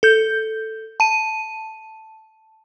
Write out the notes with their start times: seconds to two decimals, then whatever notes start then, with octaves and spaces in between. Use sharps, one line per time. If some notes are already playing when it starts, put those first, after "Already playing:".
0.03 A4 G6
1.00 A5 D#7